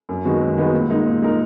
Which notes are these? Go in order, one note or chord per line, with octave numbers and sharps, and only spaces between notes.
F#2
D#3 G#3 B3 F#4
F#2
D#3 G#3 B3 F#4
A#2
G#3 D#4 A#4
A#2
G#3 D#4 A#4